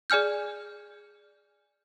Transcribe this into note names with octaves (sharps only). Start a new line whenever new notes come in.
G#4 D5 G#5 F6 G6